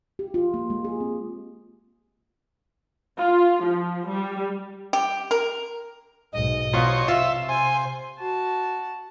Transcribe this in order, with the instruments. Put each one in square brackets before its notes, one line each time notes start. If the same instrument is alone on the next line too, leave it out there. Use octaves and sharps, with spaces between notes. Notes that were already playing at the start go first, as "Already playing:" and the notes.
[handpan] G4
F4
A#3
G#3
G#4
C4
[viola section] F4
F3
G3
[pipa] G4
A#4
[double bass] B1 G#2 [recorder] D#5
[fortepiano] E2 F4 [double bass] B2 [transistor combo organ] C5 C#5
[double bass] C3 [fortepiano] F4 [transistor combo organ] E5
[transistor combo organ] C5 [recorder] G#5
[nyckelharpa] F#4 A5